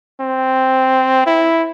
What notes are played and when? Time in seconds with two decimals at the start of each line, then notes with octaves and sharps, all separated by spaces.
0.20 C4
1.26 E4